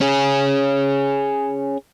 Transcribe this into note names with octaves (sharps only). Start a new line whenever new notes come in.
C#4 G#4